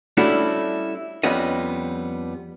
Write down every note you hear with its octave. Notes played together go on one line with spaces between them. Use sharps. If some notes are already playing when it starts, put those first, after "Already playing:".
G3 A3 C#4 D4 E4 F#4
F2 G3 B3 C#4 D#5